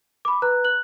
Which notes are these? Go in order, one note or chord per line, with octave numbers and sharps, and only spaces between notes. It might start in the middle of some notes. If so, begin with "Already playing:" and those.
B5 D6
B4 A#5 F#6
F#6 F#7